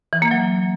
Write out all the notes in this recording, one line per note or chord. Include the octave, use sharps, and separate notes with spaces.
E3
A#3
F#3